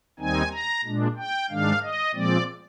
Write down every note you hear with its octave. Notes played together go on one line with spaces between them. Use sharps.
D#2 D#3 G3 C4 D#4 G#5
A#5
A#2 G#3 D4
G5
G#2 D#3 G#3 D4 F5
D#5
A#2 F3 G#3 C4 D5